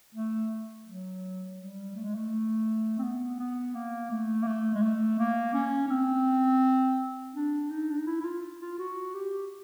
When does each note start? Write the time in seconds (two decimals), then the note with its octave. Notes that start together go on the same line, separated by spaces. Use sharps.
0.15 A3
0.86 F#3
1.59 G3
1.95 A3
2.04 G#3
2.15 A3
2.98 C4
3.03 B3
3.39 B3
3.74 A#3
4.11 A3
4.42 A#3
4.47 A3
4.75 G#3
4.82 A3
5.19 A#3
5.54 C#4
5.87 C#4
5.91 C4
7.35 D4
7.70 D#4
7.91 D4
7.98 D#4
8.07 E4
8.20 E4
8.25 F4
8.61 F4
8.79 F#4
9.14 G4